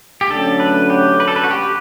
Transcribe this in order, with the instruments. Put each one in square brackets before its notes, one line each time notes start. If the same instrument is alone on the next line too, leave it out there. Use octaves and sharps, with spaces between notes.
[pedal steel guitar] G4
[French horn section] D3 F#3 A3 C#4 [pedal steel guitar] A4
[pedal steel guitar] B4
G4
B4
A4
B4
F#4
G4